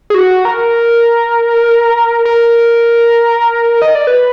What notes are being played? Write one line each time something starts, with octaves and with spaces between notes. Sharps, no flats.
G#4
F#4
A#4
A#4
D#5
D5
B4